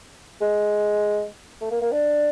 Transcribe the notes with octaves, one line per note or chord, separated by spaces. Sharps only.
G#3
A3
A#3
A#3
D4